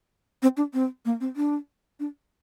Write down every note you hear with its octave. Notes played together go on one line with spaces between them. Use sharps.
C4
D4
C4
A#3
C4
D4
D4